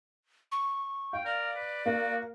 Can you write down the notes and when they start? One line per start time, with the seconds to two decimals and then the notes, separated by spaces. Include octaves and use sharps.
0.52 C#6
1.13 F5 G5
1.25 A#4 D5
1.56 B4
1.86 A#3 F#4